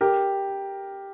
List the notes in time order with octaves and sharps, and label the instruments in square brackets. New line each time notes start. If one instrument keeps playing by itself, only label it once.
[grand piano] G4 A#4